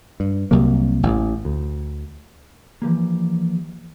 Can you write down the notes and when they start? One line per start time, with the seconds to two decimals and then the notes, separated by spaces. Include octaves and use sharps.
0.20 G2
0.51 C2 C3 F#3 A#3
1.03 A1
1.45 D2
2.82 E3 F3 G3 A#3